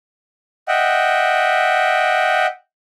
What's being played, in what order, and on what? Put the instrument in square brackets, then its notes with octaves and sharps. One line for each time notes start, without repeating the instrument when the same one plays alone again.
[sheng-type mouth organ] D#5 E5 F#5 G5